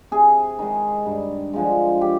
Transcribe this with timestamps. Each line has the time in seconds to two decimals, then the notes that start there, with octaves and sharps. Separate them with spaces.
0.11 C3 G#4
0.59 D#3 G#3
1.06 G2
1.53 D3 F3 G#3
2.01 G4